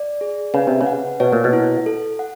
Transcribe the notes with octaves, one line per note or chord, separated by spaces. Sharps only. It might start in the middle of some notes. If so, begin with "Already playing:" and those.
Already playing: D5
G#4
C#3 B4
C3
C#3
F#5
B2 C#5
A#2
B2
E4
A4
F#5